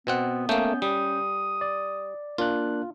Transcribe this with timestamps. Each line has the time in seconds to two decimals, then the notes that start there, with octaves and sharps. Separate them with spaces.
0.07 B2 B3 C4 F#5
0.49 A3 A#3 C#4 G6
0.82 G3 D#6
1.61 D5
2.38 A#3 D4 F4 F#6